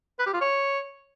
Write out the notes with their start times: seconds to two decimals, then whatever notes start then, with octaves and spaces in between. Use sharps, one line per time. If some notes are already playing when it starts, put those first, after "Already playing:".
0.19 B4
0.26 G4
0.34 F4
0.41 C#5